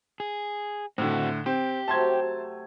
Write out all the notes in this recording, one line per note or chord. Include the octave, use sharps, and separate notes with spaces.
G#4
A2 D3 C4 F#4
C4 G4
C3 F#3 A3 A5 C6 G#6